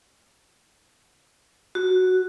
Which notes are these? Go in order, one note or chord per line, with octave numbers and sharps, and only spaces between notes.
F#4